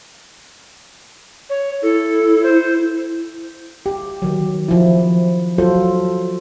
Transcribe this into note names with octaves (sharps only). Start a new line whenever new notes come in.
C#5
E4 A4
C5
G4
D#3 F#3
F3 E4
F#3 F4 A4 C5